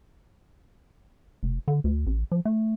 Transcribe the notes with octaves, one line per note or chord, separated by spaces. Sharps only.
F1
D3
D2
A1
F3
A3